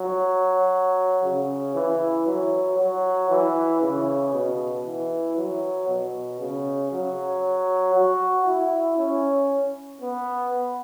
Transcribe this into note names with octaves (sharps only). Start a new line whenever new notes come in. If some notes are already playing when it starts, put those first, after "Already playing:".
Already playing: F#3
C#3
E3
F#3
F#3
E3
C#3
B2
E3
F#3
B2
C#3
F#3
F#4
E4
C#4
B3